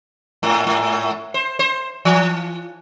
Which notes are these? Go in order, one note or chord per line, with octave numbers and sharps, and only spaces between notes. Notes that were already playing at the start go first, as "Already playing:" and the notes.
G#2
G#2
C5
C5
E3